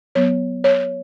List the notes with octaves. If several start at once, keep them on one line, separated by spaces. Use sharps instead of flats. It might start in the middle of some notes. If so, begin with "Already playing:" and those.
F#3 B3 C#5
C#5